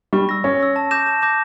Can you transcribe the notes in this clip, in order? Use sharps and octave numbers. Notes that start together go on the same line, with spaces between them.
G3 C#6
E6 A#6
C#4 C#6
E6 A#6
A5
D6 G6 A#6 E7
A5
D6 G6 A#6 E7